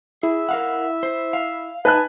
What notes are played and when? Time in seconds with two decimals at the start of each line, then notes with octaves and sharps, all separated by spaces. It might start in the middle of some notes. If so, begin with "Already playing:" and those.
0.23 E4 G#4 E5
0.49 A#4 F5 F#5
1.03 C5
1.33 F5
1.85 D#4 B4 G#5 A5 F#6